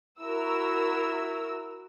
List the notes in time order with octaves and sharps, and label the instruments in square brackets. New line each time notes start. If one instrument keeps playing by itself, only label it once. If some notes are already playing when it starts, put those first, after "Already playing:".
[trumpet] E4 [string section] F#4 A#4 E6